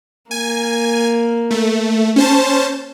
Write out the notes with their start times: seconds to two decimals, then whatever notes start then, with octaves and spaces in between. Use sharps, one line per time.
0.31 A#3 G#5
1.51 A3
2.16 C#4 C5 A5